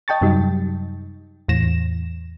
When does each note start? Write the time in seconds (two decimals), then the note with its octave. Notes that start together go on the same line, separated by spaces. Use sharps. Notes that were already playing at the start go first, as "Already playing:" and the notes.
0.08 D#5 G5 A5 C#6 A6
0.21 F#2 C3 F#3 G3 D#4
1.49 E2 A2 E3 A#6 E7